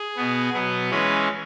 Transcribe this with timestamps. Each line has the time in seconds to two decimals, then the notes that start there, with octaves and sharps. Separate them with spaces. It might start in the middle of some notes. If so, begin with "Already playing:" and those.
Already playing: G#4
0.16 B2 B3
0.53 B2 F#3 B3
0.91 E3 G#3 C#4 B4